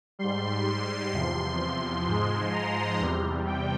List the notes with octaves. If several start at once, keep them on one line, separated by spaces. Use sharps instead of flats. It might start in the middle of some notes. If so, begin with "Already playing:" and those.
G#2 G3 C6
E2 C3 F3
G#2 F3 G#3 C6
A#5
E2 C3 G3
G5